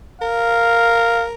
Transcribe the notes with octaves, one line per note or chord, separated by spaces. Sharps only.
A#4 F5